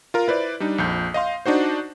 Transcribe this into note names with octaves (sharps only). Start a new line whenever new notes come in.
F4 A#4
E4 B4 C5 D5
G3 D4 D#4
A#1 F2 G6
D#5 F5 C6
D4 D#4 F#4 C5